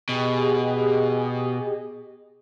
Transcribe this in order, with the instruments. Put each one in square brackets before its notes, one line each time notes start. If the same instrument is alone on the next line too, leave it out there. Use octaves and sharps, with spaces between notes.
[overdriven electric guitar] B2 [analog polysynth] G4 G#4 D#5